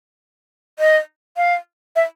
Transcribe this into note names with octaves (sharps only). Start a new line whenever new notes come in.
D#5
F5
E5